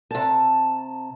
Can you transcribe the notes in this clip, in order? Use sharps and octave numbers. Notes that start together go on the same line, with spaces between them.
C3 A5